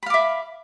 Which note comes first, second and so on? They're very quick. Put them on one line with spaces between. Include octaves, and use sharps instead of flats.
B5 F5 D6 E5